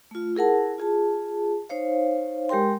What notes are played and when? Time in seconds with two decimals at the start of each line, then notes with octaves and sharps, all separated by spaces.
0.11 A3 F4
0.35 E4 G#4 A#4 F#5 A5
0.78 F4 G#4 A5
1.69 D#4 C5 C#5 F5
2.49 G#3 G4 A#4 G5 C6